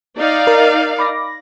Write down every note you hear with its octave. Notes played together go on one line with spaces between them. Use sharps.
D#4 D5 F5
A#4
B5 D6 A#6